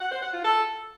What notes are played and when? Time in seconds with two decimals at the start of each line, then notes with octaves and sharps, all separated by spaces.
0.01 F#5
0.12 C5
0.23 F#5
0.34 F4
0.45 A4